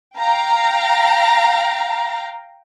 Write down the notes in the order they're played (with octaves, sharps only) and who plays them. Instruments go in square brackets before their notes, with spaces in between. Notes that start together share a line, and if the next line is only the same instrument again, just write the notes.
[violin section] F5 G5 A#5